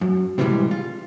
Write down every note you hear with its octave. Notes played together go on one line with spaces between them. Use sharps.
F#2
A2 C3 E3 F3 G3 G#3
F4